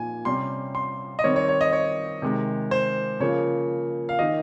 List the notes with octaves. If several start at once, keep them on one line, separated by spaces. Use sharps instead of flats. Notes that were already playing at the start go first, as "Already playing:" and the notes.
Already playing: A#2 F3 D#4 G#5
C3 G3 C#4 C6
C6
D#5
D#3 G3 C4 C#5
C#5
C#5
D#5
C#5
C3 D#3 G#3
C5
C#3 F3 A#3 C#5
F5
D#3 A#3 D#4 D#5